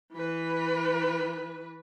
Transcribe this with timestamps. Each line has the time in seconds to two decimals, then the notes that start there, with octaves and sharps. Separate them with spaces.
0.14 E3 B4